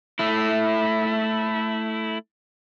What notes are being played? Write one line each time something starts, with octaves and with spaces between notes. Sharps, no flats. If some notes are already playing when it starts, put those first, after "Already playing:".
A3 E4